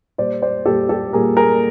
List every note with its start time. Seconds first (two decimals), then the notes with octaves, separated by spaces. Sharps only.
0.18 A#2 G3 A#3 C5 D5
0.42 C5 D5
0.65 A#2 G3 A#3 G4 A4
0.89 G4 A4
1.13 A#2 G3 A#3 G#4 A#4
1.37 G#4 A#4